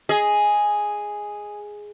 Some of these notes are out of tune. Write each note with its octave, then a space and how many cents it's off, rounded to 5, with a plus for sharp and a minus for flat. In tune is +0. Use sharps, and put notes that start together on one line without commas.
G#4 +0 D#5 +5